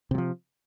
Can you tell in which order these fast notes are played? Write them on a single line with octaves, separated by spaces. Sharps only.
C3 F#3 F3